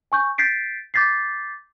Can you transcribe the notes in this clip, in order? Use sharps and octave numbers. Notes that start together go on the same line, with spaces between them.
G#5 C#6 G6
G6 A6 B6 C7 D7
D6 G6 A6 B6 C7